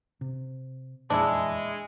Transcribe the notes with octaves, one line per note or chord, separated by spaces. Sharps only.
C3
F1 E2 A#2 G#3 D4 E4